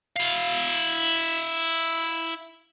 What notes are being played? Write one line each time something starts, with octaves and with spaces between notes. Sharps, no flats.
E4 F5